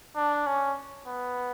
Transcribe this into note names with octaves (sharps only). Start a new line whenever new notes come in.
D4
C#4
B3